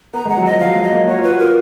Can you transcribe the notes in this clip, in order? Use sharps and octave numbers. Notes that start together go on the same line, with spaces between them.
B3 A#5
G#3
F#5
F#3
F3 D#5
F#3 F5
G#3
D#5
A#3
F#4 C#5
F4
B4
F#4
F4 A#4